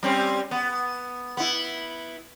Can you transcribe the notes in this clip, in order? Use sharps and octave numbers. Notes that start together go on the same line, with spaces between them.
G3 C4 C#4
B3
B3 E4